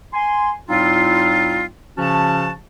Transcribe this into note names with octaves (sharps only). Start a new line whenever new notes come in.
G#5 C6
A2 G3 C4 D#4 F4
C#3 F3 C#4 F#4 A5